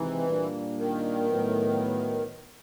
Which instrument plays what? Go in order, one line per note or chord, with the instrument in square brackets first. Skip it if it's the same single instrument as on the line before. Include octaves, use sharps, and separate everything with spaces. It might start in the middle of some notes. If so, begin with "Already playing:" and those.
Already playing: [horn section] C3 D#3 G#3 C4 D#4 [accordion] E3
[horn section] A#2 G3 A#3 D4
[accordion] D#3
[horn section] A2 F#3 B3